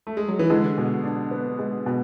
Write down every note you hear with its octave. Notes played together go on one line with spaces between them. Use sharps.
A3
G#3
F#3
E3
D3 G#3
B2
D4
B3
G#3
B2